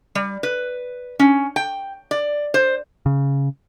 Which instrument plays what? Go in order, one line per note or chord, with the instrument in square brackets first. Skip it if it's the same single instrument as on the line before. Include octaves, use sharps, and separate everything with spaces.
[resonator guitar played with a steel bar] G3
B4
C#4
G5
D5
C5
[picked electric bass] C#3